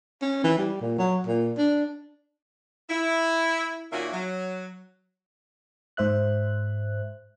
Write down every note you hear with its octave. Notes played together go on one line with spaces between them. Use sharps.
C#4
E3
G3
A#2
F#3
A#2
D4
E4
A#2 D#3 A#3 C#4 F#4 E5
F#3
G#2 C5 E5 F#6